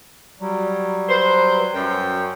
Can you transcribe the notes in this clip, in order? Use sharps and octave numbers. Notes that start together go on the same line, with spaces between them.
F#3 G3
B4 C5
F#2 G5